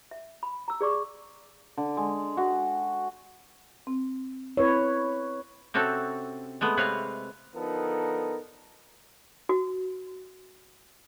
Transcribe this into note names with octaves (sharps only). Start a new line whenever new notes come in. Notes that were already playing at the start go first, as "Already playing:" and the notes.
E5
B5
A#5 E6
G#4 D5 C#6 D6
D3
G#3
F#4
C4
C4 E4 B4 C#5
C3 C4 C#4 F#4 A4
G#3 A3 B3
C3 B4 C#5 F5
D3 F3 B3 D#4 A4 A#4
F#4